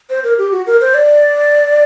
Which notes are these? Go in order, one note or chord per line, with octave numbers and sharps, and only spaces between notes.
C5
A#4
G4
F#4
A#4
C5
D5